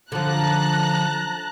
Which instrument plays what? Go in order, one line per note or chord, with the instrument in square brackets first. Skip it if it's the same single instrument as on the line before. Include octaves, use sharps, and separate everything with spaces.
[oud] D3 F3 [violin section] A5 A#5 F#6